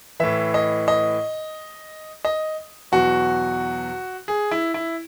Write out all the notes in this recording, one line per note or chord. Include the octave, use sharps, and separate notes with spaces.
A2 E3 E5
D#5
D#5
D#5
E2 B2 F#3 F#4
G#4
E4
E4